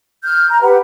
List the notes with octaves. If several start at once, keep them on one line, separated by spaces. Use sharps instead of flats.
F6 G6
A#5
G4 B4 F#5